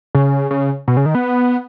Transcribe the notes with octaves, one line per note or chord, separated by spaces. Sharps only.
C#3
C#3
B2
C#3
D#3
B3